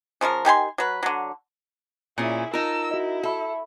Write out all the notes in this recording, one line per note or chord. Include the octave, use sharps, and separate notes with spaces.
C#3 F3 F4 A#4
D#3 G4 G#5 C6
F#3 B4
D3 F#3
A#2 C#4 E4 G#4 G#5
D#4 F4 A#4 A5 E6
E4 F#4 D#5
A4 E5 B5 C#6